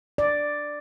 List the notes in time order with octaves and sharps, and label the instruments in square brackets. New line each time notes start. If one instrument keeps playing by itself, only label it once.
[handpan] D5